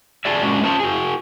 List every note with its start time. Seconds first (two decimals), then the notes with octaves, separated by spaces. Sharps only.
0.25 F#4 G#4 A4 D5 E5
0.42 G#3 C#4 D4 F#4
0.63 C#4 F4 C5 C#5 A5
0.80 F#4 G#4